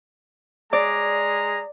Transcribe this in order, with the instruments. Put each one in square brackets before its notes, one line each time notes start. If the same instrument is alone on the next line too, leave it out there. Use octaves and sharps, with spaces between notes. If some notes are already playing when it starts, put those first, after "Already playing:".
[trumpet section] G#3 G#4 A#5 [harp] D5